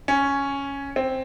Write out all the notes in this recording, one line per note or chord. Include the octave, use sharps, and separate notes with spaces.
C#4
C4